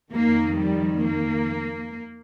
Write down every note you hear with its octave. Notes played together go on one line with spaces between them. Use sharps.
F2 D#3 A#3
G3
A#3